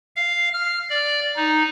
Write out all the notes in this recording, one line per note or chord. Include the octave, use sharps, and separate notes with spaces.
F5
F6
D5
D#4